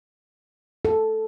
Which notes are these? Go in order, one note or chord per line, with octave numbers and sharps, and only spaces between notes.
A4